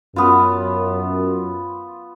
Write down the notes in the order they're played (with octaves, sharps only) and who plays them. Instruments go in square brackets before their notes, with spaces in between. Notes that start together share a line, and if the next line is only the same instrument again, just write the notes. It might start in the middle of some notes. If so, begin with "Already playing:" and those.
[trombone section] F#2 [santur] B3 F4